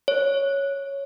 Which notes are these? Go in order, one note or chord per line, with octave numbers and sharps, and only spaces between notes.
C#5